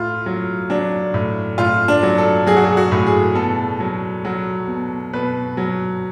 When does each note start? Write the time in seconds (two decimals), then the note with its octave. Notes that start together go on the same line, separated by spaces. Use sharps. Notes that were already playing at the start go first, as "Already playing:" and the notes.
Already playing: A2 F4
0.26 F#3
0.70 F#3 D4
1.14 A2
1.58 A2 F4
1.88 D4
2.03 F#3
2.18 A4
2.47 F#3 G#4
2.57 F#4
2.65 G#4
2.77 F#4
2.92 A2
3.07 G#4
3.35 B2 A4
3.80 F#3
4.25 F#3
4.68 B2
5.13 B2 B4
5.57 F#3